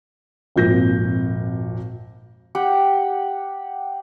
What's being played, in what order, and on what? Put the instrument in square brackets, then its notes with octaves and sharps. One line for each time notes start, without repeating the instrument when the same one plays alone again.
[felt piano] G#1 F2 A#2 G6 A#6
[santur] G4 F#5 G5